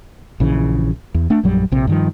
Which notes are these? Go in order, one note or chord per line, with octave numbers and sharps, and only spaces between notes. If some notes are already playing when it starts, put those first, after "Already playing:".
A#1 C#3 E3
E2
A3 D4
A#1 F#2 F#3 G3
A#1 C3
G2 D#3 F3